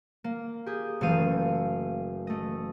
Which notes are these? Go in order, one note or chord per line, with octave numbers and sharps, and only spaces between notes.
A#3
G4 G#4
F#1 E3 A3 F5 D#7
A3 D#5